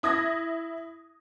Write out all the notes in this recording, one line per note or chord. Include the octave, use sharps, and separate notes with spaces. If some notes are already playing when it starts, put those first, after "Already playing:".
E4 D#6 G#6 A#6